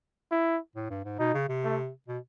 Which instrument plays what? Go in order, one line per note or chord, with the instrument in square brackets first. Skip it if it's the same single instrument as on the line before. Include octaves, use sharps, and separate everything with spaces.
[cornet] E4
[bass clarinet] A2
G2
G#2
[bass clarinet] B2 [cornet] D#4
[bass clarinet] C#3
C3
[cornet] A3
[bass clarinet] B2